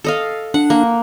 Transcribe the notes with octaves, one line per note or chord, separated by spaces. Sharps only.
A4 D#5 F5
D4 F#5
A#3